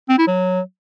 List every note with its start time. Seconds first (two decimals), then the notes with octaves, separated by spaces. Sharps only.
0.09 C4
0.18 E4
0.27 F#3